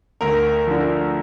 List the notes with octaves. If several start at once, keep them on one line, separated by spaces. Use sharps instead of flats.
D2 A#4
D3 F3